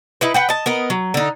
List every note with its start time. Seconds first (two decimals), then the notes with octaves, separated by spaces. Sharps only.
0.21 D#4 E4 B4
0.34 B4 F#5 G5
0.49 D#5 A5
0.66 B3 A#4 D#5
0.90 F#3
1.14 D3 D#4